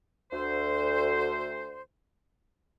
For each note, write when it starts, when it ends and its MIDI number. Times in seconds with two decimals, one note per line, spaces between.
0.32 1.81 38
0.32 1.81 72